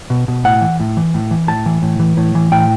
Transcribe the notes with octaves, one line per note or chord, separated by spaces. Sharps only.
B2
B2
A2 F#5
E3
A2
E3
A2
E3
A2 A5
E3
A2
E3
A2
E3
A2 G5